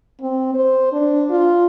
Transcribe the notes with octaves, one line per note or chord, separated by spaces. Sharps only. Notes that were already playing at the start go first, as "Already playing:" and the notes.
C4
C5
D4
F4